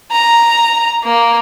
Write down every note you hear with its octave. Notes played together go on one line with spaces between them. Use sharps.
A#5
A#3